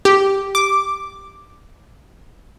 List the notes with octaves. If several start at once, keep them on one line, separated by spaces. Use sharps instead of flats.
G4
D6